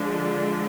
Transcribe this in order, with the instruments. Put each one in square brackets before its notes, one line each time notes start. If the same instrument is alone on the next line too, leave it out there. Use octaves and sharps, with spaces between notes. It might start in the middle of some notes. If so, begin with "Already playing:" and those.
Already playing: [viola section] D3 F3 G#3 D4